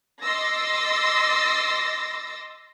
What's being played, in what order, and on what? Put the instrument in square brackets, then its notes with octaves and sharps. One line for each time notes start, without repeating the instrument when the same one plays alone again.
[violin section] D#5 C6 D6 E6 A6 A#6